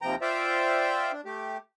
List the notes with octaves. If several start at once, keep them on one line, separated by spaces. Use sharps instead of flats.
D#2 C3 F3 G5 A#5
F4 C5 D5 E5 F5 G5
D4
A3 G4